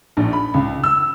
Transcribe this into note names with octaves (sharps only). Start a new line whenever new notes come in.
A#1
B5
C#2
E6